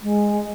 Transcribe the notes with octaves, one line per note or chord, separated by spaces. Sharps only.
G#3